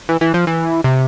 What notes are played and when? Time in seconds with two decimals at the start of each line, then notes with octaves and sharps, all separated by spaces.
0.09 E3
0.21 E3
0.34 F3
0.47 E3
0.84 C3